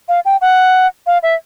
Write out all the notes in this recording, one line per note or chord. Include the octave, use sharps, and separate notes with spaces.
F5
G5
F#5
F5
E5